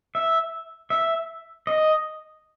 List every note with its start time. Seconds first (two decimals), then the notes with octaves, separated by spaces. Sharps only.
0.15 E5
0.90 E5
1.67 D#5